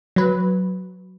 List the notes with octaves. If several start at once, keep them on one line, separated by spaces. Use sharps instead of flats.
F#3 B4